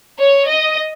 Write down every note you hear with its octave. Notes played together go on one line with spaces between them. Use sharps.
C#5
D#5